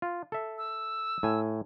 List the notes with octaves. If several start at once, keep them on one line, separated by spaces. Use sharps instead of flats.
F4
A4 E5
E6
A2 G#5